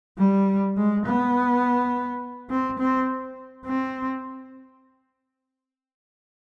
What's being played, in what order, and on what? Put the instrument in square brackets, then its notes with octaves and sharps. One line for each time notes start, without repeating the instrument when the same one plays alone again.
[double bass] G3
G#3
B3
C4
C4
C4